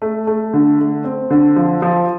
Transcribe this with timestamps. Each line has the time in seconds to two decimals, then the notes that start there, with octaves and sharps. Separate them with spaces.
0.02 A3
0.27 A3
0.53 D3
0.79 A3
1.04 C4
1.30 D3
1.56 F3
1.82 F3